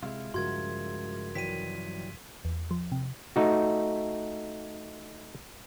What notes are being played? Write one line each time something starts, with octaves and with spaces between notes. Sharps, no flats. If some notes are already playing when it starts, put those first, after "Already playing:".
C3 G#3 E4 F4
G2 C#3 F3 F#4 A#4 C6 G#6
E3 F#3 G3 B6 D#7
E2
F3
C3
A3 D#4 F#4